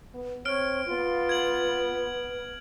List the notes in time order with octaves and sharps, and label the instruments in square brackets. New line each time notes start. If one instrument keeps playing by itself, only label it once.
[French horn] B3
[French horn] C4 [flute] C#5 [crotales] F6 D7
[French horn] B3 [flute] F4
[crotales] G#6 F#7